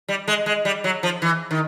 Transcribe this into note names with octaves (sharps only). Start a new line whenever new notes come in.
G3
G#3
G#3
G3
F#3
F3
E3
D#3